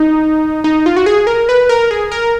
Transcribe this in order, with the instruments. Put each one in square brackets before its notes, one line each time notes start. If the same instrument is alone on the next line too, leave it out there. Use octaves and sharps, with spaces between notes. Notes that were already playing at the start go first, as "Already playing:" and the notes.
Already playing: [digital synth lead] D#4
D#4
F4
F#4
G#4
A#4
B4
A#4
G#4
A#4